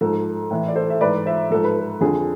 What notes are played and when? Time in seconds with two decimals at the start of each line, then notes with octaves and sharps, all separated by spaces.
0.01 G#2 F3 A4
0.51 A2 E3
0.68 D5
0.76 A4 C5
0.90 E5
1.01 G#2 E3 B4 D5
1.26 C5 E5
1.51 G#2 F3 A4
1.64 B4
1.77 A4
2.01 F2 D3 F3 G#4